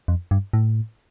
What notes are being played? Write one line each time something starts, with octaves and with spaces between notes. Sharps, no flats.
F2
G2
A2